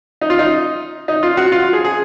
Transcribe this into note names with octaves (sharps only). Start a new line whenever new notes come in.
D#4
F4
D#4
D#4
F4
F#4
F4
G#4
G#4